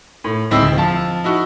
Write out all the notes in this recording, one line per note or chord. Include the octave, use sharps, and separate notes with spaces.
A2
D1 G#2 C4 E4 D#5 E6
D2
F3 A5
D#4 E4 F#4